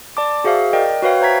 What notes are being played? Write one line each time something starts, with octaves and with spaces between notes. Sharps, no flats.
D5 A5 D6
F#4 G#4 C5 E5 F5
A#4 D5 D#5 G5
F#4 B4 C#5 F5 G5
C5 E5 A#5 G#6 B6